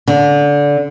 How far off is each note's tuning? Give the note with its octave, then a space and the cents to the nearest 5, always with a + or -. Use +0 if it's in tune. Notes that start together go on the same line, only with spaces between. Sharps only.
D3 -20